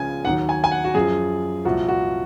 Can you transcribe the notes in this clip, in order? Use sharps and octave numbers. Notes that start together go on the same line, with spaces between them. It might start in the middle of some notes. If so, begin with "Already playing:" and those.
Already playing: C#2 C#3 F3 G#5
D#2 D#3 F#3 F#5
G#5
G#5
F#5
F#4
F#2 F3 G#4
C2 A#2 F3 F#4
F#4